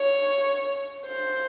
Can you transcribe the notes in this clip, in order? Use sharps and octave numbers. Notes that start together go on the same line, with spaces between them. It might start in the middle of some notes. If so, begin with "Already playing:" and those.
Already playing: C#5
C5